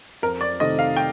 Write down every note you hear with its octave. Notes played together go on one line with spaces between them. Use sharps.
F2 A#4
D5
C3 D#3 A3 D#5
F5
G5